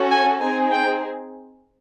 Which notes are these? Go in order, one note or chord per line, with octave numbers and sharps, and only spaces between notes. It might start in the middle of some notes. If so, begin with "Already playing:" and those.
Already playing: C#4 F#4 A4
G#5
C4 D#4 G#4 G#5
G5